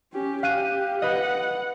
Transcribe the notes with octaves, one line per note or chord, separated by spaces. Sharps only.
C#4 G4
G4 F5 F#6 D#7
B4 D#5 F#5